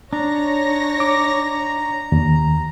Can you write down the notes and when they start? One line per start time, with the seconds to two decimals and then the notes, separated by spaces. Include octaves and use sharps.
0.13 D4 D#4 C#5 A#5 A#6
1.00 D6
2.12 D#2